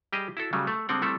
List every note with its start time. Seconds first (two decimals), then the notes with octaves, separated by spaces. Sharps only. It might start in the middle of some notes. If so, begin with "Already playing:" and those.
0.13 G3 G4 G#4 D#5
0.37 E4 F#4 A4
0.53 C#3 F#3 G3 A3
0.67 A3
0.89 D3 G3 G#3 C4 D5 F#5
1.02 G3 A3 C4 E4 A4